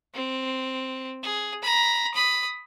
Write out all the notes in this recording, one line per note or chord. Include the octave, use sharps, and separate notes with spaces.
C4
G#4
A#5 B5
B5 D#6